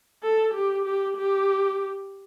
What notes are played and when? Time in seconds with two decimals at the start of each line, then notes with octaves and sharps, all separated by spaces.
0.23 A4
0.54 G4
0.86 G4
1.17 G4